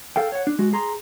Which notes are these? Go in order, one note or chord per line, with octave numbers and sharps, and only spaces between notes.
A4 F5 G5
C#5 F#5
D4
G#3 F#4
G#4 A#5 C6